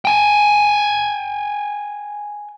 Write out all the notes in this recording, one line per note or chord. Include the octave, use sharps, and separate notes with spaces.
G5 G#5